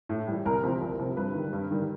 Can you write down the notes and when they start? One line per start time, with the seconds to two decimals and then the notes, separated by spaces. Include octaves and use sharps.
0.09 A2
0.28 E3 G3
0.45 C2 A#4
0.63 C3 F3
0.82 C2
0.99 C3 F3
1.17 G2 B4
1.34 D#3 G3
1.53 G2
1.71 D#3 G3